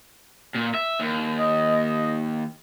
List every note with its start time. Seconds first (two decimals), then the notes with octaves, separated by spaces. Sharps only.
0.55 A#2
0.74 E5
0.99 D#2
1.39 D#5